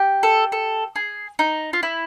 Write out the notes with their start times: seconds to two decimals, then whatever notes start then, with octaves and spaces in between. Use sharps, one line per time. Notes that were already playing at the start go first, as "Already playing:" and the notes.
Already playing: G4
0.23 A4
0.52 A4
0.96 G#4
1.39 D#4
1.73 F4
1.83 E4